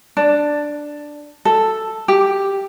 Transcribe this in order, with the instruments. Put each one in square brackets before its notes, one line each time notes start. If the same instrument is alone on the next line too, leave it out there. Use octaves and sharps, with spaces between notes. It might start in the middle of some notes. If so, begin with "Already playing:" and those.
[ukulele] D4
A4
G4